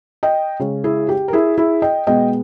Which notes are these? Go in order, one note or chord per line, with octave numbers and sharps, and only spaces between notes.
D#5 G5
C#3 G#3 C#4
E4 G#4
G4
A#4
E4 G#4
E4 G#4
D#5 G5
B2 G#3 B3 D#5 G5